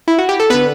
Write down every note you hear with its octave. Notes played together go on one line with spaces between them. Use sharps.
E4
F#4
G4
A4
D3 B3 B4